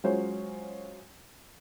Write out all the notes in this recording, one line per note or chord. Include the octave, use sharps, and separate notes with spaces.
F#3 G#3 C#4 F4 C5 C#5